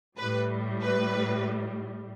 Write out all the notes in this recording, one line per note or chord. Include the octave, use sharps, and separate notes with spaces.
A2 G3 B4
B4